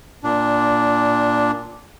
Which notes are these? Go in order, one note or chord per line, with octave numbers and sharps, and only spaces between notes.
A#2 D4